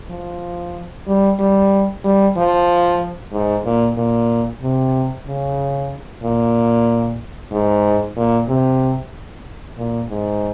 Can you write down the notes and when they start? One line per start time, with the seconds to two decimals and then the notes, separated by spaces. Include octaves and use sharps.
0.10 F3
1.07 G3
1.39 G3
2.05 G3
2.37 F3
3.33 G#2
3.65 A#2
3.97 A#2
4.62 C3
5.26 C#3
6.23 A#2
7.52 G#2
8.17 A#2
8.48 C3
9.78 A#2
10.10 G#2